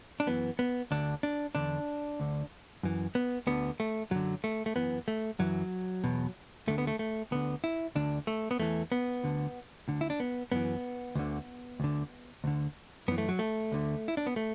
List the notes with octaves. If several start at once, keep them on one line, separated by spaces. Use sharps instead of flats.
D4
F#2 E3 B3
B3
D2 D3 D4
D4
E2 D3 D4
D2 D3
F#2 E3
B3
D2 D3 B3
A3
F#2 D3 F#3
A3
A3
F#2 E3 B3
A3
F#2 E3 F#3
E2 B2
D2 D3 A3
B3
A3
A3
D2 D3 B3
E4
D2 D3 D4
A3
B3
E2 E3 A3
B3
D2 D3
D2 D3
E4
D4
B3
F#2 E3 B3
D2 D3
D2 D3
D2 D3
F#2 E3 B3
A3
F#3
A3
D2 D3
E4
D4
B3
A3